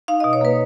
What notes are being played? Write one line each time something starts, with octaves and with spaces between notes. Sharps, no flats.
D#4 F5
B2 D#5
C#5
A#3 B4